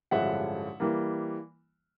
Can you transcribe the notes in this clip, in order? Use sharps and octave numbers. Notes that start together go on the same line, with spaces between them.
A1 G2 D3 F3 G#3 E5 F#5
E3 G3 A#3